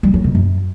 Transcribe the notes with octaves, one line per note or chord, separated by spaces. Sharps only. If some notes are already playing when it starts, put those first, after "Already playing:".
G3
F#3
B2
F#2